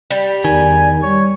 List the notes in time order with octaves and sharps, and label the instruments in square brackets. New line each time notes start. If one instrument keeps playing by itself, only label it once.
[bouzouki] G3
[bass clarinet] E2 [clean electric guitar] D#3 [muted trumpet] G#5
[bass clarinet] G3 [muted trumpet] C#5